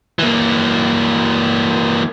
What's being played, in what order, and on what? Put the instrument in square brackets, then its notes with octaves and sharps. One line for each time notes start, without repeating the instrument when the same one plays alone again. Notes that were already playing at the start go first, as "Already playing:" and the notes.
[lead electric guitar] E3 A#3